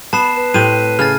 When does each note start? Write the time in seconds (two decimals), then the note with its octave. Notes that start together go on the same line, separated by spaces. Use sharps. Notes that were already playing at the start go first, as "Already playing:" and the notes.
0.13 B3 A5 C7 E7
0.37 B4
0.54 A2 C4 G4 D#7
0.99 C#3 F6 A6